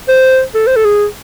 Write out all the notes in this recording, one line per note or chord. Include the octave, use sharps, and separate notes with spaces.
C5
A4
C5
A4
G#4